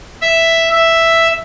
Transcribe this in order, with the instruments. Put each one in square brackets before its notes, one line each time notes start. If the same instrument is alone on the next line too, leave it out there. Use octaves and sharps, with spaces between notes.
[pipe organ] E5
E5